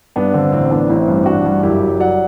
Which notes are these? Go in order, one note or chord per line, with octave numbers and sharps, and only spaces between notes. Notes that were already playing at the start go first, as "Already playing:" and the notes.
G2 B3 D4
D3 C4
A1 C4
A1 B3 D4
A1 C4 E4
G2
A1 D4 F#4
G2
F#1 E4 G4
F#3
F#3 D5 F#5